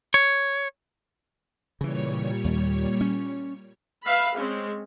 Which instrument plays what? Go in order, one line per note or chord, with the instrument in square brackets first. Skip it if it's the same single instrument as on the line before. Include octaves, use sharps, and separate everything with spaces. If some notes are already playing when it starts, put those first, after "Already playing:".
[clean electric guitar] C#5
[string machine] A#2 G3 C#5 [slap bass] C#3 E3
[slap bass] D#2
C#4
[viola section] B4 E5 F5 B5
G#3 C4 C#4